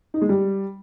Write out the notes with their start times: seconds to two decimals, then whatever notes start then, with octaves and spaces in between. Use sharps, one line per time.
0.14 D#4
0.22 G#3
0.29 G3